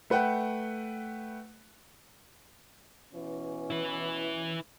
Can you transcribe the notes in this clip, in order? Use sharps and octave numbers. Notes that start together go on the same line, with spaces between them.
A3 B4 F#5 G5
B2 E3 C#4
E4 B4